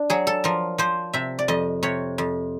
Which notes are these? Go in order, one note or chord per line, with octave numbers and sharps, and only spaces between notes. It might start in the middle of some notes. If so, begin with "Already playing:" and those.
Already playing: D4
F#3 G#4
A4
F3 A#4
F3 C5
C3 E5
D5
F2 D#5
C3 C#5
F2